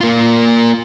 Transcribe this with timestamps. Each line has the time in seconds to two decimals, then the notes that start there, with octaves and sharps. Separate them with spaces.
0.01 A#3 F4